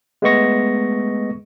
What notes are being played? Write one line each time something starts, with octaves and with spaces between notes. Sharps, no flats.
G#3 A3 B3 D#5 C#6 A#6